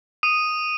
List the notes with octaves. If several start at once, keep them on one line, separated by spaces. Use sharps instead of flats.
D#6 D#7